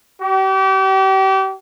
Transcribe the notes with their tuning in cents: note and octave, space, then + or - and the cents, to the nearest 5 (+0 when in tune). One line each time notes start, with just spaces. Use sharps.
G4 -35